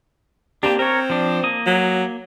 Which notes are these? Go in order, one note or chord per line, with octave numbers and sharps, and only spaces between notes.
A#3 C4 D4 G4
C4 A#4 C#5
F3 D4
A#3 D#6
F#3